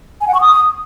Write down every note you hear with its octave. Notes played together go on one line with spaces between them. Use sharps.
G#5
F#5
C#6
D#6